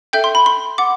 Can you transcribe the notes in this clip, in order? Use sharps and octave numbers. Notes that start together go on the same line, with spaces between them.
A4 E5 G5 G6
C6
B5
C6
F#5 D6